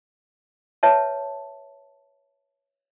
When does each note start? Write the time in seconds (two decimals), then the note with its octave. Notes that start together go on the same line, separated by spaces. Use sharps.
0.83 B4 C#5 E5 A5